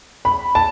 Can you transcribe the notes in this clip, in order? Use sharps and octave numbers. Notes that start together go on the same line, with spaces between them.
B5
A5